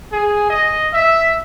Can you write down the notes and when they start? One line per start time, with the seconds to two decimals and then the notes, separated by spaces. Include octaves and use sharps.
0.12 G#4
0.50 D#5
0.93 E5